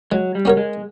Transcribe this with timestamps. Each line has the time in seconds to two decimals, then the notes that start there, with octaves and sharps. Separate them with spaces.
0.12 F#3 G#3
0.35 G3
0.45 C#4 F#4 A#4 C#5
0.57 G#3